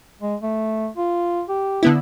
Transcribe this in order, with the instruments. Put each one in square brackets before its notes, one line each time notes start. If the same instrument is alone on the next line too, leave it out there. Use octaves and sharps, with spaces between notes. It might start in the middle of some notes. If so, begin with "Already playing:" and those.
[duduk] G#3
A3
F4
G4
[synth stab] D3 B3 E4